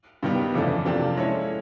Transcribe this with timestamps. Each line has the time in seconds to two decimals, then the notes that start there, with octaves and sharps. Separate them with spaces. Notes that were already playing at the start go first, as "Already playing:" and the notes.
0.23 G2 D#3 G3 B3
0.54 F2 C#3 E3 A3 D4
0.85 C3 F3 A#3 D4 G4
1.16 G#3 C#4 E4 A4 C#5